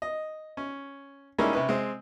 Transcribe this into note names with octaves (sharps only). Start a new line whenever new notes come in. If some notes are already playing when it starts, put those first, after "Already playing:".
D#5
C#4
G3 G#3 A#3 C#4 D#4 E4
C3 C#4 B4
G#3 C4